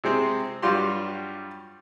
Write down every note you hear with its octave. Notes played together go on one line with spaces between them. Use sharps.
C3 G#3 C4
G2 F#3 G3 F4 G4 C6